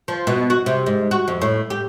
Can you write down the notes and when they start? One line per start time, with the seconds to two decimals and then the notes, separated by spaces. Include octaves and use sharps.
0.08 F3
0.27 B2
0.50 F#4
0.66 C3
0.86 G#2
1.11 F#4
1.28 F2
1.42 A2
1.70 G4